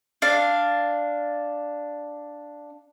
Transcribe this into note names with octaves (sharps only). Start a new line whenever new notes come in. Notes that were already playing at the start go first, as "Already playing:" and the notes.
D4 F5